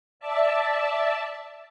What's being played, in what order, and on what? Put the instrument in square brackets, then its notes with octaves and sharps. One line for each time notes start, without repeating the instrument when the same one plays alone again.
[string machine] D5 E5 A5